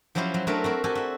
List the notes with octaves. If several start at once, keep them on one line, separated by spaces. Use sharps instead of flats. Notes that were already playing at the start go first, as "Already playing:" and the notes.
F3 F#3 C#4 E4 G4 C5
F#3
F#3 A3 D4 A#4 E5
C4 F#4 A#4
F#4 G4 A4 G#5
F#4 E5